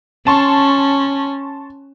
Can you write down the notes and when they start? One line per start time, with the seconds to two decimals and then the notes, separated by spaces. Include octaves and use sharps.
0.27 C#4 A5 C6 C#6